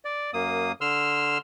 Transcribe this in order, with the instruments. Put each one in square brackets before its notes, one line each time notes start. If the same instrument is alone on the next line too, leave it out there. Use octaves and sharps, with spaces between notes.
[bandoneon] D5
F#2 A#3 D#6
D3 C6 E6 F6